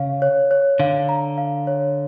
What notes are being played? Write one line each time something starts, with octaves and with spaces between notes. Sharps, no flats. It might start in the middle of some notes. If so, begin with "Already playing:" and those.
Already playing: C#3 C#5 F5
C#5
C#5
D3 F5
A#5
F5
C#5